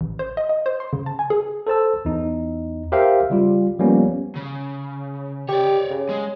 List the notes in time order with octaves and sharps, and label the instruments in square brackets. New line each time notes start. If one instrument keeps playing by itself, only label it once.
[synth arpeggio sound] A1
C5
D#5
D#5
C5
C6
C#3
A5
G#5
G#4
[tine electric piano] A4 C5 A5 E6
E2 D#4
G4 A#4 C5 E5 F5 G5
C#3 G3 F4 G4
F3 G3 A#3 B3 C#4
[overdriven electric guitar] C#3
[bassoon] G4 [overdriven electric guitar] C#5 D5
[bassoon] C#3
[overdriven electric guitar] G#3